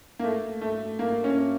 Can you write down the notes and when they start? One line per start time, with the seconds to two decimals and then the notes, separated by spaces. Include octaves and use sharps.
0.19 A#3
0.24 A3
0.62 A3
0.99 A#3
1.24 C#4